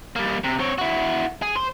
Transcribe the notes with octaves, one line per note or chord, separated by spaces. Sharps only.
G3 A#3
C3
C4 C#5
E4 F#4
G#4
C5